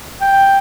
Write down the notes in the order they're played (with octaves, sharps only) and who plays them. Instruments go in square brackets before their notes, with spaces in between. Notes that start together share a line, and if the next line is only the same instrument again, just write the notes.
[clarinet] G5